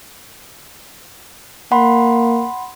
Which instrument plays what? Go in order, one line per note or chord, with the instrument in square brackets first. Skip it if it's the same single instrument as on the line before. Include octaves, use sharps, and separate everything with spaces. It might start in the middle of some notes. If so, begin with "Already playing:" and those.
[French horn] A#3 [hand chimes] F#5 B5 C6